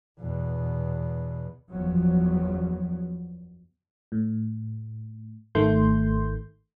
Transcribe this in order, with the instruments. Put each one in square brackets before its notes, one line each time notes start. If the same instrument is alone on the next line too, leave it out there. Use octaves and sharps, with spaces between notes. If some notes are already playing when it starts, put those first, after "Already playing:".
[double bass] E2 B2
[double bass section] F#1 E2 F3 F#3 B3
[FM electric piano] A2
G#1 G#2 D#3 A3 C6 G6